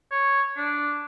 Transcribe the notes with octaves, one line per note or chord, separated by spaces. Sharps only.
C#5
D4